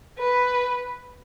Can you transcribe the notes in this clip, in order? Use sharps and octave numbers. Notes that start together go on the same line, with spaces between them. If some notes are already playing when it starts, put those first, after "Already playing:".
B4